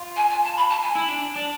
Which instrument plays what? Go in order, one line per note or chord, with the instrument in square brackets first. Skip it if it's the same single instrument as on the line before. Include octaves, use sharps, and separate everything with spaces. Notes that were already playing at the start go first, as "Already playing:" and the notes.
Already playing: [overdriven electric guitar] F4
[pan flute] G#5
G#5
A5
B5
A5
G#5
[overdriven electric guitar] E4
D4
D4